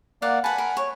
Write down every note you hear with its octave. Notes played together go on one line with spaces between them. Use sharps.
A#3 D5 F5 F#5
B4 F#5 G#5 A5 B5
A#4
C#5